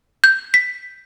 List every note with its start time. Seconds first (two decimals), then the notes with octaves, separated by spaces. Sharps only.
0.24 G6
0.54 B6